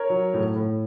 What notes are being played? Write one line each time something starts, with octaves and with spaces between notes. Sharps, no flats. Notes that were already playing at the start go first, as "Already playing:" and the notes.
Already playing: A#4 C#5
F#3
A2
A2